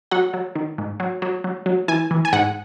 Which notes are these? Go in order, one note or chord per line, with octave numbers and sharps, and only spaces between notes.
F#3 F#5
F#3
D#3
G#2
F#3
F#3
F#3
F#3
E3 G#5
E3
G#5
G#2 F#5